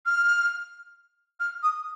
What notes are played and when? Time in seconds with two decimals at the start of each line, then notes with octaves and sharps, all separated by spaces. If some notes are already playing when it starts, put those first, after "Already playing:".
0.06 F6
1.40 F6
1.63 D#6